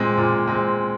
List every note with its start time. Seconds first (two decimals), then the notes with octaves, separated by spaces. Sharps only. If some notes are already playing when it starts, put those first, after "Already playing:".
Already playing: A#2 G#3 C4
0.18 A#2
0.48 G#3 C4